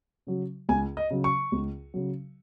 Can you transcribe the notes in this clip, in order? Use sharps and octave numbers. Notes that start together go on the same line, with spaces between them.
C#3 F#3
C#2 G#5
D#5
C#3 F#3
C#6
C#2
C#3 F#3